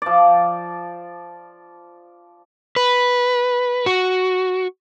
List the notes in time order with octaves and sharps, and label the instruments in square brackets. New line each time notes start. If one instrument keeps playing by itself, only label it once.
[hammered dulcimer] F3 D5
[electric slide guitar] B4
F#4